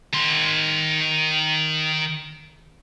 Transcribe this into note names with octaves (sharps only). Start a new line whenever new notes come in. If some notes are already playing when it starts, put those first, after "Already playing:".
D#3 C6